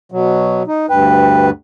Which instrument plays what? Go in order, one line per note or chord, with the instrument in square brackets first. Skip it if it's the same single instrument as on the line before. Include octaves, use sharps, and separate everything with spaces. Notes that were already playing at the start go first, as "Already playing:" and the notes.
[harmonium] B2 F#3
D#4
[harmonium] D2 G2 B4 [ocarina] G5